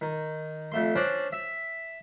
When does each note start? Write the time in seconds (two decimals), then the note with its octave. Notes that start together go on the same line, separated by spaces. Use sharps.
0.01 D#3
0.72 F2 A3 C6
0.95 C#4 D4 C5 D5
1.32 E5